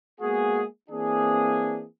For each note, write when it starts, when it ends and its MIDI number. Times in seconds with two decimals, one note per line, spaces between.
0.21 0.64 56
0.21 0.64 58
0.21 0.64 59
0.21 0.64 66
0.21 0.64 68
0.91 1.84 52
0.91 1.84 58
0.91 1.84 60
0.91 1.84 62
0.91 1.84 68